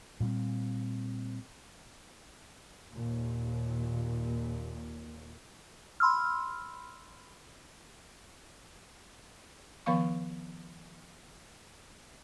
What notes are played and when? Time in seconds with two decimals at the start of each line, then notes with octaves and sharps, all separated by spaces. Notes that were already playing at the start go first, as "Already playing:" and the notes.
0.20 A#2 G3 B3 C4
2.93 D#2 A#2
6.00 B5 C6 E6 F6
9.86 D#3 F3 B3 F5 C#6